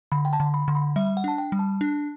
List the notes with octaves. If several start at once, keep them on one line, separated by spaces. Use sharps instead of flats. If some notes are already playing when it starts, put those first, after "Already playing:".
D3 B5
G5
A5
D3
B5
D3 C6
B5
G3 E5
F#5
D4 A5
G5
G3
A5
D4